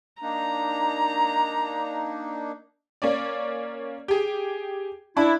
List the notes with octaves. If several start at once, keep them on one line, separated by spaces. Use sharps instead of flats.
A#3 D4 D#4 A#5
A#3 C#4 D5
G4 G#4
D4 E4